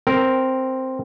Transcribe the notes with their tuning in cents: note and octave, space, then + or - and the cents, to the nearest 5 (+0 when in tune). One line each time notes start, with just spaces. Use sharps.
C4 +0 A#4 +0